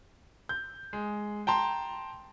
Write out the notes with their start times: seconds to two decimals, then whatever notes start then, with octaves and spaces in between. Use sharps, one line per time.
0.49 G6
0.93 G#3
1.47 G5 A5 A#5 C6